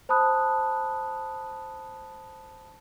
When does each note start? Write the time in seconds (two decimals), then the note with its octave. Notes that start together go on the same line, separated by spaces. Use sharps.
0.09 C5 A5 B5 D#6 F#6